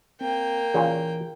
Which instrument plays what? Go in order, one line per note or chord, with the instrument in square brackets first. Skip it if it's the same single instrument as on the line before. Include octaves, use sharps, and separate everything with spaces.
[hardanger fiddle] A#3 G5 [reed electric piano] C4
[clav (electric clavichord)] A#2 C#3 [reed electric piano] E3